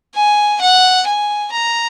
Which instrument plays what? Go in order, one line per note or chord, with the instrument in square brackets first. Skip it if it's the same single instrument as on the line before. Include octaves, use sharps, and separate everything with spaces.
[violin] G#5
F#5
G#5
A#5